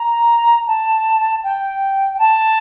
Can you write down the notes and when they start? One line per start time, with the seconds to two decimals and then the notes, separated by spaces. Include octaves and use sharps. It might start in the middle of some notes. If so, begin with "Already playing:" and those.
Already playing: A#5
0.67 A5
1.43 G5
2.13 G5
2.19 A5